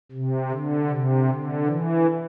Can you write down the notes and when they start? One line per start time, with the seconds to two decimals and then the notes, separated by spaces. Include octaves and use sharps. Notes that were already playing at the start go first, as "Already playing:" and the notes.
0.12 C3
0.51 D3
0.90 C3
1.28 D3
1.66 E3